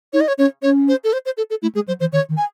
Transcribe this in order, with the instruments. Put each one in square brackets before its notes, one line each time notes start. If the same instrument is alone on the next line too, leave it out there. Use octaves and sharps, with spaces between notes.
[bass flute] D#4 [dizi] C#5
[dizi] D#5
C#5
[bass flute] C#4 [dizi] C#5
[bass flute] C#4 [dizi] C#5
[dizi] C5
A4
C5
C5
A4
A4
[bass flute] A3 [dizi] E4
[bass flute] G#3 [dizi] G#4
[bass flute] F#3 [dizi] C5
[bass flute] E3 [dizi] C5
[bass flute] D#3 [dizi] C#5
[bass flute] D#3
[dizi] G#5